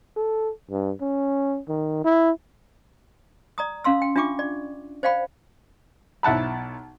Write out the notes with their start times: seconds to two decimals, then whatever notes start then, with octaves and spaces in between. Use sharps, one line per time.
0.17 A4
0.71 G2
1.01 C#4
1.69 D#3
2.05 E4
3.58 D5 A#5 D#6
3.84 C#4 F5 C6 E6
4.02 G5
4.16 D4 F4 E5 G5 C#6 D6
4.39 D5
5.03 C5 D5 F5 G5 B5
6.23 B1 E4 F#5 A5 B5